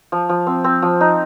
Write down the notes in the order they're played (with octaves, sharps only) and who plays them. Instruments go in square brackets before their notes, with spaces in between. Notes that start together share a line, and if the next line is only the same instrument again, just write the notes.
[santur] F3
F3
C4
C4
F3
D#4